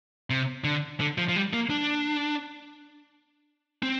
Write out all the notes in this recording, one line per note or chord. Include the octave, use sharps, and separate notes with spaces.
C3
D3
D3
F3
F3
G3
A#3
D4
C4